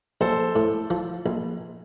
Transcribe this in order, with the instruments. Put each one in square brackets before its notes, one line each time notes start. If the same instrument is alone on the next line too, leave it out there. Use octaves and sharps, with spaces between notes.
[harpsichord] A#1 [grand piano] A4 C5
[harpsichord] A2
F3
A#1